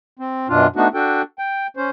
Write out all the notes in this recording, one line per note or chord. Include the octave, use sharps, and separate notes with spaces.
C4
F#2 B2 D4 F4
A3 B3 D4 D#4 F#4
D4 F#4 A4 G5
G5
C#4 C5